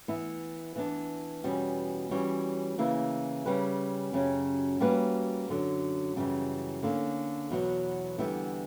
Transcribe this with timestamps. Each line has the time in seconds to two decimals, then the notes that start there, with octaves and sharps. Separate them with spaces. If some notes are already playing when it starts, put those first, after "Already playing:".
0.08 E3 B3 E4
0.76 E3 B3 D4
1.44 E2 B2 G3 C#4
2.11 E3 G3 C#4 F#4 C#5
2.78 C#3 E3 A#3 E4
3.46 C#3 G3 C#4 G4 B4
4.13 F#2 C#3 F#3 C#4 G4
4.80 G3 A#3 C#4 F#4 B4
5.48 F#2 D3 F#3
6.16 F#2 C#3 E3 G3
6.83 D3 A#3 C#4
7.50 E2 B2 F#3 B3
8.18 E2 D3 G3 B3 E4